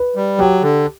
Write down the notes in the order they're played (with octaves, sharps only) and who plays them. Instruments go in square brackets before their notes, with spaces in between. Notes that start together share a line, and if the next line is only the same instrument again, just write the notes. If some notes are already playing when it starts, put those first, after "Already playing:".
Already playing: [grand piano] B4
[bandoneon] G3
[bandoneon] F#3 [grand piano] G4
[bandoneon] D3